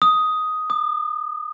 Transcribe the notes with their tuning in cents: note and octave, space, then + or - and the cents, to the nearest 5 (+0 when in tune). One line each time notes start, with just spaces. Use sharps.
D#6 +5
D#6 -45